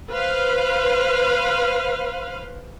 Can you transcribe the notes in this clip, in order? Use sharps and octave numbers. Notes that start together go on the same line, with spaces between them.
B4 C5 F5